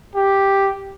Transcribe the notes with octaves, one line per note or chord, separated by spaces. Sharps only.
G4